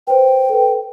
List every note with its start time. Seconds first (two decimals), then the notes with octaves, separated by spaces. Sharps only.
0.07 B4 C5 G5
0.49 A4 B4